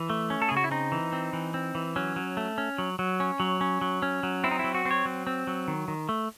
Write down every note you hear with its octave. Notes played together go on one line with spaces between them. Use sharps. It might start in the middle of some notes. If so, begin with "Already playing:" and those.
Already playing: E3
A3
C#4
A4
G#4
C#3
F#4
E4
C4 D#4
E3
C4
E3
C4
E3
F#3 C#4
F#3
A3
C#4
F#3
F#3
C#4
F#3
C#4
F#3
C#4
F#3
C4 E4
D#4
F#3 E4
F#4
C4
C#5
F#3
C4
F#3
D#3
D#3
A3